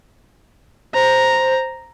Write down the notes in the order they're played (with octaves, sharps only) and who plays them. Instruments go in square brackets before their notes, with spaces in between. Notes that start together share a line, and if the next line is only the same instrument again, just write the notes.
[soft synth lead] C5 [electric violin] A#5